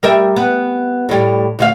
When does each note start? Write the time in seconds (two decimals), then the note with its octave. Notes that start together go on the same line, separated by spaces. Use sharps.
0.03 G3 A#4 E5
0.36 B3
1.09 A2 G3
1.59 D2 F#4 F5